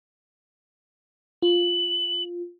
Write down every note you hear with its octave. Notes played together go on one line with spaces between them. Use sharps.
F4 F#7